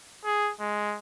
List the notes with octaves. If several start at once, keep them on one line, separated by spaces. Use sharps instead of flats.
G#4
G#3